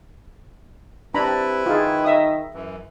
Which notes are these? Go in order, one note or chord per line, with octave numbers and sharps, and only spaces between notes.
C4 D4 E4 G4 B4 A#5 B5
D#3 D#4 F4 G#4
D#5 E5 D#6
F#2 E3